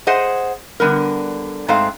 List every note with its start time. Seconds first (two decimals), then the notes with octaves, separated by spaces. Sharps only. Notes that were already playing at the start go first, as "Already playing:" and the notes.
0.07 G#4 C5 D#5 F#5
0.80 D3 G3 B3 A#4
1.68 G#2 G#3 A3 C4 F5